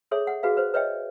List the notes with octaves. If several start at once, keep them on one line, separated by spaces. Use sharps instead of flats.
G#4 A4 C#5 E5 C6
F#5
F#4 G#4 B4 F5
B4 C5
B4 C#5 D#5 E5 G5